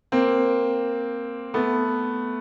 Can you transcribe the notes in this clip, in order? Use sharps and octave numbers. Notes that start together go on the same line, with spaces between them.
A#3 C4
A3 B3